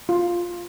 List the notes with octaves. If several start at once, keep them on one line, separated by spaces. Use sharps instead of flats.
F4